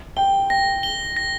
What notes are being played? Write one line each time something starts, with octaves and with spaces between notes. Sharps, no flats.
G5 G7
G5 A#6
G7
A#6